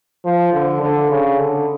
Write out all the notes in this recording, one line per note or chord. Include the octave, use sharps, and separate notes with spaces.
F3
D3
D3
C#3
D3